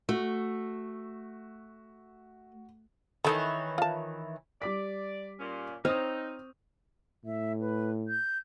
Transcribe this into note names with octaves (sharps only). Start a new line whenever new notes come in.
A3 F#4
D#3 E3 D#4 A4 C#5 B5
F4 A5
G3 D5 D6 B6
A#2 C#4
C4 D#4 C5 C#5 D#6 F6
A2 E5
B4
G6